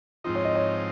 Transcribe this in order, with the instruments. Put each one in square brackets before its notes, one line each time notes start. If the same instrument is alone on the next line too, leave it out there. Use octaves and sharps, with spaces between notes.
[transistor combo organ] G#2 F3 C4 D#4 [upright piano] F4
[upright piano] C#5
D#5
C#5